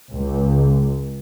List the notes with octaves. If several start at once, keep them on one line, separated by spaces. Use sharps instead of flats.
C#2